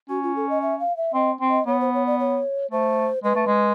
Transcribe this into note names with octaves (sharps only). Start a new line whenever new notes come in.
C#4 F#4
F4
A4
D#5
E5
F5
E5
C4 D#5
C4
D#5
B3 C#5
C5
C#5
D5
C#5
A3 C5
G#3 B4
A3
G#3